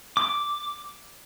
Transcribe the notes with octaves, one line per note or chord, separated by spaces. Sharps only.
D6